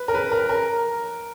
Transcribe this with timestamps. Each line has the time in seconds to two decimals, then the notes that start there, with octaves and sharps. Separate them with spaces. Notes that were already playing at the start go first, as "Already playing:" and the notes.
Already playing: B4
0.08 A#4
0.14 B4
0.32 A#4
0.49 A#4